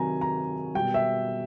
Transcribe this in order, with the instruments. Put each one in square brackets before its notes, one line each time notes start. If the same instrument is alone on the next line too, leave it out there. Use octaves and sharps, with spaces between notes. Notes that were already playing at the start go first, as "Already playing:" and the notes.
Already playing: [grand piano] C3 D#3 F#3 G#5 A#5
A#5
B2 G3 G5
E5